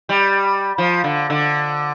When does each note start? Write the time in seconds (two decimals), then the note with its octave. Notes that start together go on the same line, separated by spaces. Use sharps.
0.09 G3
0.78 F3
1.04 D3
1.30 D3